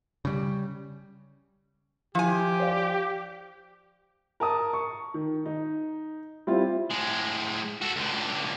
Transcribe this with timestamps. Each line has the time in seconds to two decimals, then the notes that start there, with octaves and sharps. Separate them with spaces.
0.25 C#3 G3
2.15 F3 E4 G4 G#5
2.60 C5 D5 F5
4.40 A#4 A5 D#6
4.73 C#6
5.14 D#3
5.46 D#4
6.47 G3 C4 E4 F4
6.90 A2 G#3
7.81 F#4 A4
7.96 C#2 D3